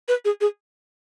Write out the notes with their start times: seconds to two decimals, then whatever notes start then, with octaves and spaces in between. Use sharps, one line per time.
0.08 B4
0.25 G#4
0.41 G#4